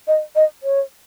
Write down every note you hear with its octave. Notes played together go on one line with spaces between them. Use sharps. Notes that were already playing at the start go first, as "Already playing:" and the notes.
D#5
D#5
C#5